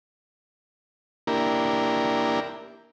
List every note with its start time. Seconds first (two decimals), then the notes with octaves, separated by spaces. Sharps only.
1.27 A#3 D4 E4 G4 A#4